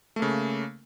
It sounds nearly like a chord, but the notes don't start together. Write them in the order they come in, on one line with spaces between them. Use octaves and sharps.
A3 A#3 C#3